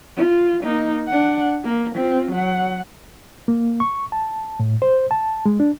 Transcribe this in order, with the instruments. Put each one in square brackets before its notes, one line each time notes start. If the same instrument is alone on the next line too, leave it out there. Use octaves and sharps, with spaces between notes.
[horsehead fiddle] F4
A#3 D#4
D4 F#5
A#3
C4 F4
F#3 F#5
[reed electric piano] A#3
C#6
A5
A2
C5
A5
G#3
D4